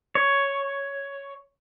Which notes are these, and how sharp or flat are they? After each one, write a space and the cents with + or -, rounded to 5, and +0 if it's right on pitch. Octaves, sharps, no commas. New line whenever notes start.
C#5 +5